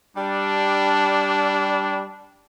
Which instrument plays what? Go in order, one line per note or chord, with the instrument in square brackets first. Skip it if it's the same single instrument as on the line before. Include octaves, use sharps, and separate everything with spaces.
[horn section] G3 D4